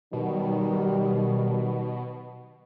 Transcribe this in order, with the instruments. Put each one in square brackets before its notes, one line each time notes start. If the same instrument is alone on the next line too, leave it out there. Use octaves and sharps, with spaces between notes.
[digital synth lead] B2 [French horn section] D#3 F#3 G3